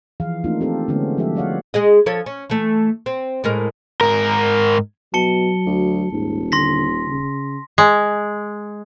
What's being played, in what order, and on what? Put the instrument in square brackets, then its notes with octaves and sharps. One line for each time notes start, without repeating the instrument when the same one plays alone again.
[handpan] E3 F3 G#4 F5
A3 A#3 C4 D4 D#4 F4
C4 G4 A4 A#4 C5
D3 G#3 A3 B3 C#4 A4
F3 F#3 G#3 G4 A4 E5
F#3 F4 C#5 D5 F5 F#5
[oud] G#3 G#4 D#5
F3 A4 C#5
C#4
E3 A3
C4
A2 G#3 A#4
[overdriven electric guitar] G#2 A#4
[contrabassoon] B2 [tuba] F#3 [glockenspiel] A5 C#7 G7
[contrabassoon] D2
[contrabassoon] D#1 [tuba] G#2
[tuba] D3 [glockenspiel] C6 A#6 B6
[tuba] C#3
[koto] G#3